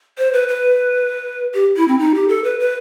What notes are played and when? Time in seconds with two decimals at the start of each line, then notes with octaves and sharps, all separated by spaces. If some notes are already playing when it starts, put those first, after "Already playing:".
0.18 C5
0.33 B4
0.48 B4
1.54 G4
1.76 E4
1.88 C4
1.99 D#4
2.15 G4
2.29 A4
2.44 B4
2.60 B4